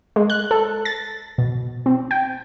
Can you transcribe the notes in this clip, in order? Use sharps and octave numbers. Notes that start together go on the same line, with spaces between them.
G#3
F#6
A4
A6
B2
C4
G5